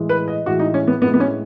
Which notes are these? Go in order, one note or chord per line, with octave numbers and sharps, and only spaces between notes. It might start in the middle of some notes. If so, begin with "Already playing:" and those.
Already playing: A2 E3 G#3
B4
D#5
A2 E3 G#3 F#4
D#4
C#4
B3
A2 G#3 B3
B3
C#4